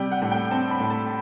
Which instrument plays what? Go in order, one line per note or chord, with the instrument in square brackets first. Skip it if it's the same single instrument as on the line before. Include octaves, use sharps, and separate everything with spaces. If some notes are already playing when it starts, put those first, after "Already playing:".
Already playing: [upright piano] C3 G3 G5
F#5
A2
G5
C4 A5
B5
A2
A5